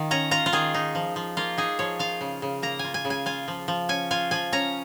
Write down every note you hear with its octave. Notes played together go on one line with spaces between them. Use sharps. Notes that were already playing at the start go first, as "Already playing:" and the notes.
Already playing: D#3 F4
C#4 A#5
F4 A#5
F4
D#3 G#4
D#4
F3
F3
A#3 F4
D#4 G#4
F3 C#5
F4 F5
C#3
C#3
A#3 A#5
F4 G#5
G#5
C#3
G#5
F4 G#5
F3
F3
C#4 G#5
F4 G#5
F3 G#5
C#4 A#5